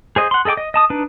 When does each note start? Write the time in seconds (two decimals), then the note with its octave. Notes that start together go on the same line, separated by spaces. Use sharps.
0.16 G#4 C5 D#5
0.31 F#5 C6
0.45 G#4 A4 D#5 G5 D6
0.57 D#5
0.74 D#5 A5 D#6
0.90 D4 D#4 B4